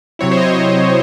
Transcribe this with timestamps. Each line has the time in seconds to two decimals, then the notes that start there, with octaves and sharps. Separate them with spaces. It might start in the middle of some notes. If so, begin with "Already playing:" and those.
0.19 C3 F#3 C4 E4 C#5
0.32 C5
0.37 D#5
0.42 C#5
0.54 D#5